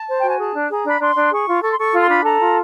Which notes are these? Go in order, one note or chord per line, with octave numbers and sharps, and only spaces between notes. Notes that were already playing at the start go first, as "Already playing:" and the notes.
Already playing: A5
C5
F#4 G5
G#5
G#4 A5
D4
G#4 A#5
D4 B5
D4 C6
D4
G#4 C#6
F4
A4 C#6
C6
A4 C#6
F4
C6
D4 B5
A4 A#5
F4